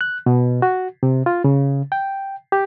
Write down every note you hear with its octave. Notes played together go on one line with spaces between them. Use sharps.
F#6
B2
F#4
C3
F4
C#3
G5
G4